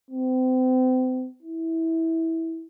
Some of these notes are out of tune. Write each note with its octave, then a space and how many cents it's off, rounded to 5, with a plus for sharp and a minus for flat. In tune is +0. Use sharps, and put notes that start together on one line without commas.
C4 -35
E4 -15